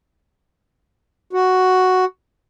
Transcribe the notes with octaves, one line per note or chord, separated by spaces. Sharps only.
F#4